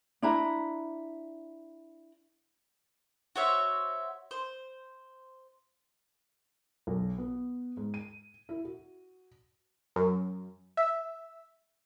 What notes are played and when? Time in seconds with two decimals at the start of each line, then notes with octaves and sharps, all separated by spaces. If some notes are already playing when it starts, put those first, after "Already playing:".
0.22 D4 E4 A#5
3.36 F#4 C5 C#5 E5
4.31 C5
6.87 B1
7.18 B3
7.77 G#2
7.94 D#7
8.49 E4
8.65 F#4
9.96 F#2
10.77 E5